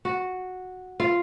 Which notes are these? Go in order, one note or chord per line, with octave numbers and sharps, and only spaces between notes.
F#4
F4